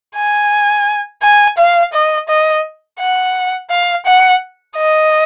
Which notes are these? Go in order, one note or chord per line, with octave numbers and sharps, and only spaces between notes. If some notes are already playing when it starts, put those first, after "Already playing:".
G#5
G#5
F5
D#5
D#5
F#5
F5
F#5
D#5